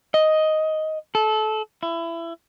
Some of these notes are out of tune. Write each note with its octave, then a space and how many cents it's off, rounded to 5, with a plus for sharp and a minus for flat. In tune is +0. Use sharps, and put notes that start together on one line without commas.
D#5 +5
A4 -25
E4 +25